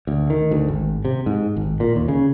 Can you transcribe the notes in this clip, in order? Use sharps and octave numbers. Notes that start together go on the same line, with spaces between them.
D2
D#3
D2
G#1
C3
G#2
G#1
A#2
D#2
C#3